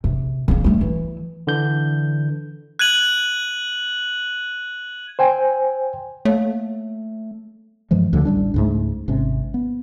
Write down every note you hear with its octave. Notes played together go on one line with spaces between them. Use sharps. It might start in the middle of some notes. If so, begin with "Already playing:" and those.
C3
C#3 C#4
G3 A3
E3
D3 E3 G6
F#6 G#6 D#7 F#7
C5 G5 G#5
A3 A#3 C#5
G2 E3 F3 G#3
D2 D3 F3
A1 G3 D4
C#2 G#2 A3
G#1 C3 C#4
B3